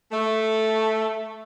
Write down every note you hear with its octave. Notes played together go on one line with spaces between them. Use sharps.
A3